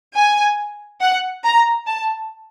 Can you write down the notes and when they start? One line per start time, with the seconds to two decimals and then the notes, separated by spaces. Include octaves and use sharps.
0.15 G#5
1.01 F#5
1.44 A#5
1.86 A5